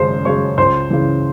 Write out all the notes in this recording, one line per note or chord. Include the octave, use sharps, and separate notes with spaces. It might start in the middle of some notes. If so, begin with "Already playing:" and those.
Already playing: G#1 F#2 C#3 G#3 C5 C6
F#2 C#3 G#3 C#5 C#6
C#2 C5 C6
C#3 E3